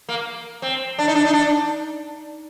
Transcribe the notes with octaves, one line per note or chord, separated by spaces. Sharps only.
A#3
C4
D4
D#4
D4
D#4
D4